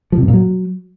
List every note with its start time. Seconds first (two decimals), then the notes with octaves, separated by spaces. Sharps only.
0.12 F3
0.18 C3
0.23 F#2
0.28 A#2
0.33 F#3